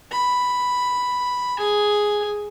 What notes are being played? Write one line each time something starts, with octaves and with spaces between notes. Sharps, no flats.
B5
G#4 G#5